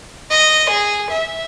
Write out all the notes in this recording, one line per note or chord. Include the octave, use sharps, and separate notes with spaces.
D#5
G#4
E5